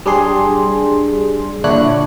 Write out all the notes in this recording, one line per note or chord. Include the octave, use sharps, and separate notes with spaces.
G3 D4 G#4 C6
A#2 D3 D4 E4 C#5 F#6